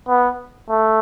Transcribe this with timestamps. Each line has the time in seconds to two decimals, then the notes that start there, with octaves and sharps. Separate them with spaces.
0.08 B3
0.69 A3